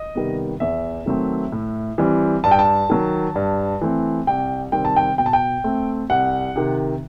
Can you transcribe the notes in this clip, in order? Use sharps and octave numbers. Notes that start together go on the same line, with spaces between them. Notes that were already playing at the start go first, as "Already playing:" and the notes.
Already playing: D#5
C3 D#3 G3 B3
E2 E5
D#3 F#3 A3 C4
A2
E3 G3 C4
G2 A5
G5
A5
D#3 F#3
G2
E3 A3 C4
C2 G5
C3 D#3 G3 C4 G5
A5
G5
B2 G5
A5
G5
A3 C4
C2 F#5
C3 D#3